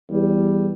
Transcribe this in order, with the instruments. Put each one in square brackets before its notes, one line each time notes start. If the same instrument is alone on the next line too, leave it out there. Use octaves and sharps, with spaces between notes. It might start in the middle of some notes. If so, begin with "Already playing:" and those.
[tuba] E2 [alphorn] G3